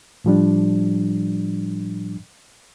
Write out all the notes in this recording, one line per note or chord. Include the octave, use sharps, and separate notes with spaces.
A2 F3 G3 D4